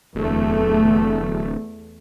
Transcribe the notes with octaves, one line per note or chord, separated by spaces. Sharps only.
D1 E2 A3